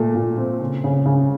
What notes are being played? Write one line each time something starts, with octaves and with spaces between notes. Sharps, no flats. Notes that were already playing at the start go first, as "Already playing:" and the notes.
Already playing: A#2 A3
A#2
C4
C#3
C#3
C#3